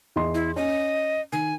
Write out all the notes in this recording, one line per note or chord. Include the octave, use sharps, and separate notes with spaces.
E2 D#5 C6
E4
C#4 D#5
D#3 G#5